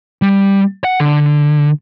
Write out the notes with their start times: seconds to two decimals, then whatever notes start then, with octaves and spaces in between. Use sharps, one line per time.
0.22 G3
0.84 F#5
1.00 D3